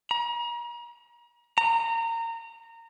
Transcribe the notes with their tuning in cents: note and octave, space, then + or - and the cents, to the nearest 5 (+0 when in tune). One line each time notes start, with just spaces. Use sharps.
A#5 +40
A#5 -25